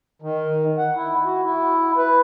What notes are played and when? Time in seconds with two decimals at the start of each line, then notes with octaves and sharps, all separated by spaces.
0.22 D#3
0.78 F#5
0.95 E4
1.24 F#4
1.44 E4
1.97 B4